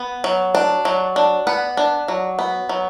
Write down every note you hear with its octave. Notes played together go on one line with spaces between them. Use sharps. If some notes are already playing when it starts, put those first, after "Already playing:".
Already playing: B3
F#3
D4
F#3
D4
B3 F#5
D4
F#3
B3
F#3